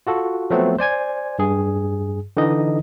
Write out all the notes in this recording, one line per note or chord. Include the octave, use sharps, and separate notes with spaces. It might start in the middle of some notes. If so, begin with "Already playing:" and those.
F4 F#4 A4
F3 F#3 A3 B3 C4
C5 D5 G#5 G#6
G2 G#4
D3 E3 D#4 D#5